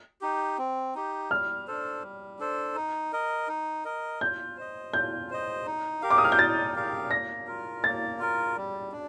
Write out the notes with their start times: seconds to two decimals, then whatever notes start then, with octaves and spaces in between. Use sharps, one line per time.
0.21 D#4 G4
0.58 C4
0.95 D#4 G4
1.30 G3 F6
1.67 D4 A4 C5
2.03 G3
2.39 D4 A4 C5
2.76 D#4
3.13 A#4 D#5
3.48 D#4
3.85 A#4 D#5
4.21 F4 G6
4.57 C5 D#5
4.94 F4 G6
5.30 C5 D#5
5.66 D#4
6.02 G4 A#4 F5
6.10 D6
6.18 D#6
6.24 F6
6.32 G6
6.38 D#4 A6
6.76 G4 A#4 F5
7.11 A#3 A#6
7.47 F4 A#4
7.84 A#3 A6
8.19 F4 A#4
8.57 G3
8.92 D4